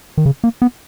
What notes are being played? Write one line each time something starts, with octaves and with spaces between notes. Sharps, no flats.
D#3
C#3
A#3
B3